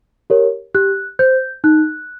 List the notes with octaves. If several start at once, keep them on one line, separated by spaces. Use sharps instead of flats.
G4 A#4 C#5
G4 F#6
C5 G6
D#4 F#6